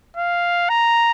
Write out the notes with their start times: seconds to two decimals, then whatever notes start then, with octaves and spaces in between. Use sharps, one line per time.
0.17 F5
0.69 A#5